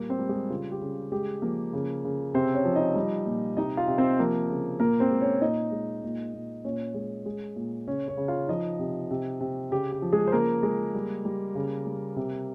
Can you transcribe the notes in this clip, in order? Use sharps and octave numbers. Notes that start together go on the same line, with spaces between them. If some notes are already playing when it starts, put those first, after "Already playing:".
Already playing: A#2 G3 A#3 A#4
C4 C5
G3
G#3 G#4
C#3 F4
G4
C#3
G#3 G4
F3 A#3 A#4
C#3
C#3
C3 C4 C5
C#4 C#5
F3
D#4 D#5
G3
A#2
C3 D#4 D#5
F4 F5
C3
C4 C5
F3 A#3 A#4
C#3
A#2 A#3 A#4
C4 C5
G#3
C#4 C#5
A#2 D#4 D#5
G#3
A#2
A#2
A#2 C#4 C#5
G#3
G#3
A#2
C#3 C#4 C#5
C#4 C#5
C#3
F4 F5
F3 D#4 D#5
C3
C3
C3
C#3 G4
G4
F3
G#3 G#4
C5
C#3 A#3 A#4
G#3
G3
G3
C#3
G3
C3